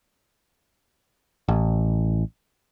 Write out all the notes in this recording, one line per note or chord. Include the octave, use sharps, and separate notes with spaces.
A1